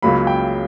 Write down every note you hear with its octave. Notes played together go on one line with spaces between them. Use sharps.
C#2 C#3 F#3 A#3 B5
G5